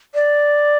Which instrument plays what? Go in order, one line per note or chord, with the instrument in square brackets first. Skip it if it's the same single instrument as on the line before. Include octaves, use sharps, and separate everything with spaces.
[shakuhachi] D5